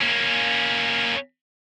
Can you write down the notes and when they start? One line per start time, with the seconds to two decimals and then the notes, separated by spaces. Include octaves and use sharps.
0.01 A#3 C#4